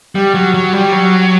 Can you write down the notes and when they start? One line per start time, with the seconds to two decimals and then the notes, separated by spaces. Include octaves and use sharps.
0.15 G3
0.34 F#3
0.54 F#3
0.73 G3
0.92 F#3